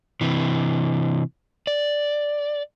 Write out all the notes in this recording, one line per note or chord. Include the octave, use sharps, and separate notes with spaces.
C3 E3
D5